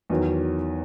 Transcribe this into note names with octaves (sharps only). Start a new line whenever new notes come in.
E2 D#3 F#3